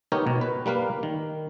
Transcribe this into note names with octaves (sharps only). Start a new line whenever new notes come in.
B3 D#4 G4 A#4 C#5
B2
B4
G3 A#3 B4 F5
D#3